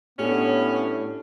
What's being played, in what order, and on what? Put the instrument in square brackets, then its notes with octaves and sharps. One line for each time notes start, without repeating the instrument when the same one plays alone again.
[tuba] A2 [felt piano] A3 D4 G4 [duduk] B3 [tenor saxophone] C#4